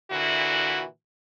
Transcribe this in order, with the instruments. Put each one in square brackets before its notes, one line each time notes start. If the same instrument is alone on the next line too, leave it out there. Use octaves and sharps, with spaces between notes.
[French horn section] A#2 D3 E3 E4 F#4